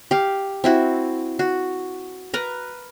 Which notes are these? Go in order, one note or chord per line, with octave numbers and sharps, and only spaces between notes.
G4 F5
C4 E4 F#4
F#4
A#4 B4 A#5